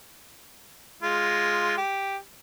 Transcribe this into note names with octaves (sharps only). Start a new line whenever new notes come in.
G#3 F4
G4